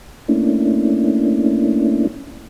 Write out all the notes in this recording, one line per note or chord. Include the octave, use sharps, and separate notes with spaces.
A3 A#3 C#4 D4 E4